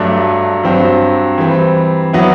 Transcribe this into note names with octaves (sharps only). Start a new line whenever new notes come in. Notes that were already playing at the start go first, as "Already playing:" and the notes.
Already playing: G2 F#3 A3 D4
G2 F#3 C4
E3 G3 C4
F#3 B3 E4